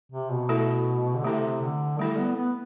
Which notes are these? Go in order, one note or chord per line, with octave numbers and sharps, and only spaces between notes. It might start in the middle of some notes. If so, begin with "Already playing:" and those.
C3
B2
A3 E4 A4
D3
C3 A3 E4 A4
D3
G3 A3 E4 A4
B3
B3